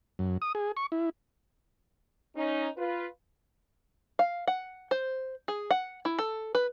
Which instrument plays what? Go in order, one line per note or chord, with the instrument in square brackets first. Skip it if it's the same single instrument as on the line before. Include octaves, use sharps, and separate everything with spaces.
[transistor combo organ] F#2
D#6
G#4
C#6
E4
[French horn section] C#4 D#4
F4 B4
[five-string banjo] F5
F#5
C5
G#4
F#5
E4
A4
B4